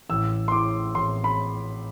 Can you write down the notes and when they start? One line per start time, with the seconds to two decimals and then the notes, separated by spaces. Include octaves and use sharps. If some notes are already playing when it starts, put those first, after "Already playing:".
0.09 A1 E6
0.48 C6
0.52 A2 D6
0.94 A1 C6
1.24 B5